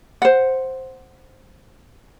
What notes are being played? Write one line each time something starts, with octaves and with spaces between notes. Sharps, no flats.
C5 F#5